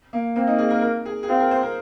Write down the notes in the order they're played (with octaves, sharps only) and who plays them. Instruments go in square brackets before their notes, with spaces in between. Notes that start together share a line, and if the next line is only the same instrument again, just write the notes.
[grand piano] A#3
[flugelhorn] A#3 [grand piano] C4
[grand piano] D#4
G#4
A#4
A#4
G#4
G#4
[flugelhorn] C4 [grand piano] F4
[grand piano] A#4
C5
A#4